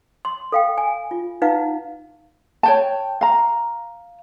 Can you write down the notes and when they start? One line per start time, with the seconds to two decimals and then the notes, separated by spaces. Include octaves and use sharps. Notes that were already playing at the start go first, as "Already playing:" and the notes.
0.25 C6
0.52 A4 F5 G5
0.78 G#5
1.11 F4
1.42 D#4 E4 B4 F5 F#5
2.63 C#5 G5 A5
3.21 F5 A#5